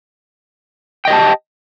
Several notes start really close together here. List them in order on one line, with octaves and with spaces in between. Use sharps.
G5 D#5 G4 A5